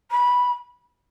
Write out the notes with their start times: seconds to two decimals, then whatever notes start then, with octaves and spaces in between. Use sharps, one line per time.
0.11 B5